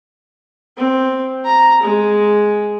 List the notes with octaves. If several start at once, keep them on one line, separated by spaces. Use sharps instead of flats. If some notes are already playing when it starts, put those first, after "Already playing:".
C4
A#5
G#3